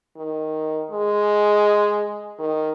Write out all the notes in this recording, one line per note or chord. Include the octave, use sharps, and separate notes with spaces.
D#3
G#3
D#3